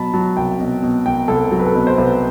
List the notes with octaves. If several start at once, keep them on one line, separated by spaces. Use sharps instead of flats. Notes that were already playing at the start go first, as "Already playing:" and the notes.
Already playing: B2 F#3 A5 B5
F#3 A5
C2 G5
B2
B2
C2 G5
C2 A4
F#3 A4
B4
A4
B2 B4
C5
C2 B4